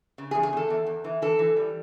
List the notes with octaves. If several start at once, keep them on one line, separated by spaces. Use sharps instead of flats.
C#3
G#4
E2
G#4
E2 A4
E2
E2
E3
E3 A4
E3
G3